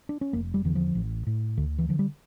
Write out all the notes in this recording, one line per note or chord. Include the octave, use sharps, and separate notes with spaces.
D4
C#4
F1 A#3
G3
E2 D3 E3
F3
A1
A2
D2 D3
E3
D3 F3
G3